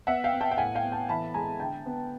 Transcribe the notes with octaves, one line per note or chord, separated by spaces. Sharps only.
B3 E5 F#5
F5 G5
B3
G5 A5
G5
A2 F#5 G#5
F5 G5
B3
G5 A5
E3 A5 B5
G#3 G#5 A#5
D3 G5 A5
B3